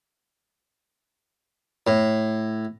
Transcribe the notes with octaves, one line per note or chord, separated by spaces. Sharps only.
A2